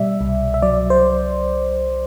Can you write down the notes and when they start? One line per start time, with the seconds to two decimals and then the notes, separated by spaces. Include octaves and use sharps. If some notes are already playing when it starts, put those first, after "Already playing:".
Already playing: B2 G3 D5 E5
0.21 C2
0.54 E5
0.62 F#3 D5
0.90 C5